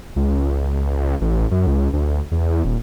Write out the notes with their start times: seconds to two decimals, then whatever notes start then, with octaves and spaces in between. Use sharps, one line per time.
0.16 C#2
1.21 A1
1.51 F#2
1.67 C#2
1.93 D2
2.31 E2
2.65 D#1